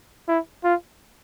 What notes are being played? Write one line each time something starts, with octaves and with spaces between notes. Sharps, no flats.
E4
F4